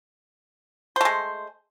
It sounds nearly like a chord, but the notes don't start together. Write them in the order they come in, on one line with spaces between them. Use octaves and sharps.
C5 A3 G#3